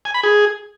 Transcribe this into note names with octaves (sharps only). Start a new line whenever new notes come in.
G#5
B5
G#4